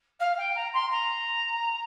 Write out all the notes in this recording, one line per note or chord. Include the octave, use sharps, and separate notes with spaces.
F5
G5
A#5
C6
A#5